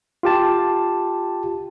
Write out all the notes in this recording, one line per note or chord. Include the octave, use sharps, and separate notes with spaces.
F4 G4 A5